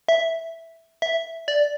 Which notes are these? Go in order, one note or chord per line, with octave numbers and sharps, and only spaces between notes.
E5
E5
D5